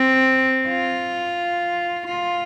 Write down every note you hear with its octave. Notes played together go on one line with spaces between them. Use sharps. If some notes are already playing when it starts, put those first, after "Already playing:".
Already playing: C4
F4
F4